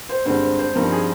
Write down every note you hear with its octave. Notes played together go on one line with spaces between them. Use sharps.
C5
G2 D3 G#3 C4 C5
C5
C5
G2 F3 C4 D#4 A#4
G#4